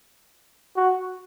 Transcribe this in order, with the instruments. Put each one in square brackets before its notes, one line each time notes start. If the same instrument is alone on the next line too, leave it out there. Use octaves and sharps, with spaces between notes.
[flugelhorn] F#4